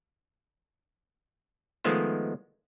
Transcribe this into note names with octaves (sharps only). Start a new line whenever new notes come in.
D#3 F3 G#3 A3 B3 C5